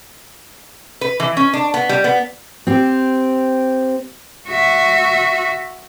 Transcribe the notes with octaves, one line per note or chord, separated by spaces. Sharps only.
B4
E3
C#4
D4
B3
G3
B3
C4 G4
F#4 E5